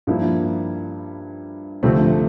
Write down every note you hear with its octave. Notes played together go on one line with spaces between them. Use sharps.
G2 F3 A#3 E4
D2 C3 F3 A3 C4